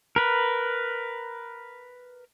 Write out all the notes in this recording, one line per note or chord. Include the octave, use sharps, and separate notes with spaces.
A#4 B4